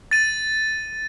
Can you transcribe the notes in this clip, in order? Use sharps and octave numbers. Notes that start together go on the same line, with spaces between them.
A6 D#7